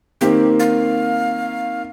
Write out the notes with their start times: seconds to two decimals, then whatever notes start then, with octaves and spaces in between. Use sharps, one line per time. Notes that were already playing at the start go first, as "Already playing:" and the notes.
0.21 D#3 A#3 C4 G4
0.60 F5